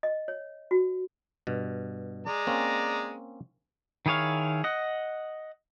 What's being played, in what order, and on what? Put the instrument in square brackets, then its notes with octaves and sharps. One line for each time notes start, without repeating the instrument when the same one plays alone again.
[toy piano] D#5
C#5
F#4
[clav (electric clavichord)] G2 B2
[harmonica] G#3 D5 A#5
[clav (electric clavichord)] A#3 C4 C#4
[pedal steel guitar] D#3 E4 G#4 C#5 F5
D#5 F#5